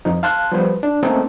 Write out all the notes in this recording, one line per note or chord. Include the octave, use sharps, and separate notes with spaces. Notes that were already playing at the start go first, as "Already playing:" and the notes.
F2 F3 D#4
F5 A5 C6 F#6
F3 G3 B3 B4 C5
D4
A3 A#3 C4 C#4 D#4 A4